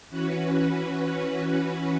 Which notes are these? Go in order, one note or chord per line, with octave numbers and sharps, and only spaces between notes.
E3 C#4 F#4 B4